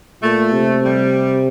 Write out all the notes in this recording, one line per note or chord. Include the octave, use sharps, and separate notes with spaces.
A#2 A3
C3
G3